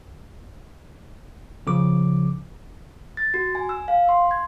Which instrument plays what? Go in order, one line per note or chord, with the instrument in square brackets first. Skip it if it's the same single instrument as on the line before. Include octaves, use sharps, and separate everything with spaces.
[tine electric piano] C#3 F3 D6
[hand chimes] A6
F#4
G#5
E6
F5
C6
G#6